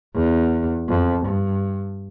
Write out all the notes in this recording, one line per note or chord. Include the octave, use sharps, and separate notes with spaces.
E2
F2
G2